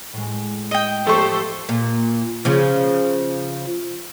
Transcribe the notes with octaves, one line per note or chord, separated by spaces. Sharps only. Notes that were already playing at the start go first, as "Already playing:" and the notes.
A2 G#3
D#5 G5
F3 A3 G4 A4 C5 C#6
A#2
C#3 F3